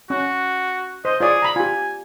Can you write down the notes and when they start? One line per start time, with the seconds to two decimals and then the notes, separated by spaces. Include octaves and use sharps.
0.10 C#4 F#4
1.05 C5 D#5
1.20 F4 G#4 C#5 D5
1.42 A#5 B5
1.56 F4 G4 G#5